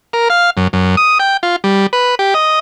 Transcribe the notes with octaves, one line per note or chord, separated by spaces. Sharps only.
A#4
F5
F#2
F#2
D#6
G5
F4
G3
B4
G4
D#5